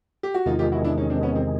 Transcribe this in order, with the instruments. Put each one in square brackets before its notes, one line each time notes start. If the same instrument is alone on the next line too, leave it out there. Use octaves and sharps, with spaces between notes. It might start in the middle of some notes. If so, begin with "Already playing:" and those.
[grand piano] G4
F#4
[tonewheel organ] E2 C3 D#3 G#3 [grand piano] D#4 F4
[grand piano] F4 G4
E4 F#4
D4 E4
C#4 D#4
C4 D4
B3 C#4
C4